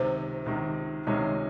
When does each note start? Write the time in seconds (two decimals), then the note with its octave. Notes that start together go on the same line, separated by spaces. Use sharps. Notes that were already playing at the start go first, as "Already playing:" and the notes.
Already playing: C#2 C3 D#3 C5
0.46 C#2 C3 D#3
1.07 C#2 C3 D#3 G#3 C#4